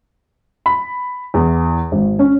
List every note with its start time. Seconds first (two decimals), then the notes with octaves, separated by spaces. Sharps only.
0.66 B5
1.34 E2
1.92 G#1
2.19 C#4